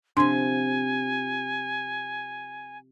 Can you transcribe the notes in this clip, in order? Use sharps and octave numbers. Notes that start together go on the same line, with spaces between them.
C3 F3 D4 G#5 C6